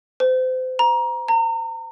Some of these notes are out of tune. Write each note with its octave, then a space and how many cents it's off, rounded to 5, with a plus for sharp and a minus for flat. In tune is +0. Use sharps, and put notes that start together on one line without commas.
C5 -30
A#5 +25
A#5 -35